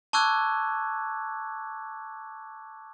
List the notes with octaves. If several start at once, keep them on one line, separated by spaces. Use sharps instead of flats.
A5 C#6 D6 E6 F#6 G#6